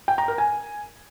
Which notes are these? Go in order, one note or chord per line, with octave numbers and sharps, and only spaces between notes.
G5
A#5
A#4
G#5